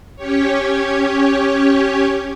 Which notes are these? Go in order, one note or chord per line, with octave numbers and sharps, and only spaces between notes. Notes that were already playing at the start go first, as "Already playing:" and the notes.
C#4 G4 C#5